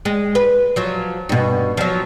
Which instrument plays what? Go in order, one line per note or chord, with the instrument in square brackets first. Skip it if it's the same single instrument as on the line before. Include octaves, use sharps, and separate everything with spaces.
[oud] G#3
B4
F3 F#3
G2 B2
F3 F#3